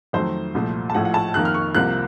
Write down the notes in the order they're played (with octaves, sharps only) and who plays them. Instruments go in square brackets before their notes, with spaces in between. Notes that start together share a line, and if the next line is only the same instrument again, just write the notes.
[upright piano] F2 D#3 F#3 A3 C5
C2 A#2 F3 A3
A5
A#1 A2 F3 A3 F#5
F#5
A5
F2 D#3 A#3 F#6
F6
C#6
C2 C3 F3 A#3 F#6